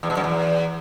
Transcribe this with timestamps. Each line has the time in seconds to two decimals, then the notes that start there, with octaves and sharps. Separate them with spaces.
0.03 E2
0.10 B2
0.17 F#2
0.24 E2